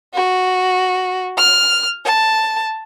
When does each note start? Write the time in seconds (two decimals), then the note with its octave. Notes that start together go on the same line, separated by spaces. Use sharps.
0.14 F#4
1.37 F6
2.05 A5